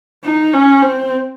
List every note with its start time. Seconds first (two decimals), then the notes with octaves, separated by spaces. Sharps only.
0.25 D#4
0.54 C#4
0.82 C4